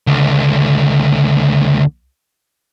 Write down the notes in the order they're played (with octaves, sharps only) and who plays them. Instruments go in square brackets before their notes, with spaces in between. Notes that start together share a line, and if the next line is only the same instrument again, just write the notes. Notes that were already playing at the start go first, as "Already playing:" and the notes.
[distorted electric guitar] C#2 D3